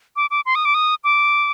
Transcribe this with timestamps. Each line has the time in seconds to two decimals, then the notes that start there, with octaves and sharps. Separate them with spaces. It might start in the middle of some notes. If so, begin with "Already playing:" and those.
0.16 D6
0.31 D6
0.46 C6
0.55 D#6
0.65 D6
0.74 D#6
1.04 D6